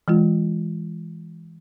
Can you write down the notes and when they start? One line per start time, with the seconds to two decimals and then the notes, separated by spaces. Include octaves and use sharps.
0.08 E3 G#3 F4